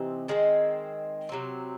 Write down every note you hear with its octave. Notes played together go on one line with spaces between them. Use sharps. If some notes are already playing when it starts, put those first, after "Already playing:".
Already playing: C3 E3 C4 D#4
D#3 G#3 C4
C3 F#3 C4